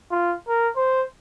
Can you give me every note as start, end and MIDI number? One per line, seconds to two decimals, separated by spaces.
0.11 0.35 65
0.48 0.68 70
0.76 1.03 72